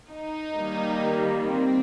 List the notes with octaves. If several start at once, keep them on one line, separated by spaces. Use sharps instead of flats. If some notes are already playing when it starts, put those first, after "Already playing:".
D#4
D#3 G3 A#3
C4